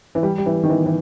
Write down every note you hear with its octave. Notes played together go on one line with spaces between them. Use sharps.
E3
G3
G3
E3
D#3
E3
E3